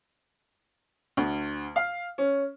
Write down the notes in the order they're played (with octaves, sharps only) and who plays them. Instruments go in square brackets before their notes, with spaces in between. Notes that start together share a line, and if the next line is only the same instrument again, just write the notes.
[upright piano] D2
F5
C#4